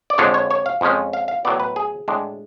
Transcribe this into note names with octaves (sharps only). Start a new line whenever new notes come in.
D5
F2 D3 F3 G#3 D4 C#5
C#5
C#5
F5
F2 F3 G#3 C#4
F5
F5
A2 F#3 B3 D5
B4
G#4
A2 G#3 D4